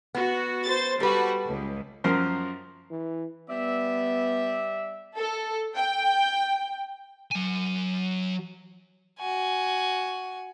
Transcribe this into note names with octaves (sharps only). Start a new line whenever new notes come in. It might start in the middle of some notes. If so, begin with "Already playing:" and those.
B3 F#4
C5 A6
G3 F#4 A4 B4
C#2
F#2 F3 A#4 C5 C6
E3
G3 B3 D5 E5
A4
G5
F#3 G#5
F#4 G#5